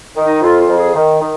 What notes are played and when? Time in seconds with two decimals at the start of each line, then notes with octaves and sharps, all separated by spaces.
0.16 D#3
0.24 D#4
0.41 F2 F4
0.59 F4
0.68 F2
0.77 G#4
0.95 D#3
1.21 D#3